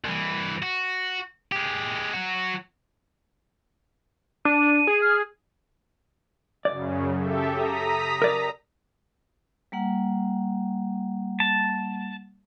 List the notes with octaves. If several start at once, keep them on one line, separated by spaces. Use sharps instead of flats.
C2 E3
F#4
G#3 G4
F#3 F#4
D4 D#7
G#4
F6
F#2 C#3 D5
G4 A4 E5
A#5 D#6 B6
A#4 D5 A#5
G3 A#3 F#5
A5